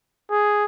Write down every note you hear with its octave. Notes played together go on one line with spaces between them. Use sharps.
G#4